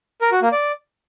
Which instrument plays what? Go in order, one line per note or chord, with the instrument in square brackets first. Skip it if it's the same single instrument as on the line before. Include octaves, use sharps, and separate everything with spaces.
[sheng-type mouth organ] A#4
F#4
A#3
D5